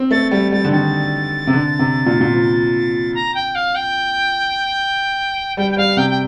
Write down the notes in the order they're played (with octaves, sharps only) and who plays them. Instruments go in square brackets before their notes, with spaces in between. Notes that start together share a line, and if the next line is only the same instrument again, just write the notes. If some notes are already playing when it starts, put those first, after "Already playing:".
Already playing: [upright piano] C4
[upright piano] A3 [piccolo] A6
[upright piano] G3 [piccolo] A6
[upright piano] G3 [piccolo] A6
[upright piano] D3
[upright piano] D#3 [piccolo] A6
[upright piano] C3
D3
C3
A#2
A#2
F3
[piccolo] A#5
G5
F5
G5
[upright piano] G3 [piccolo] G5
[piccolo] G5
[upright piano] G3 [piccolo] F5
[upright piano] C3 [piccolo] G5
[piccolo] G5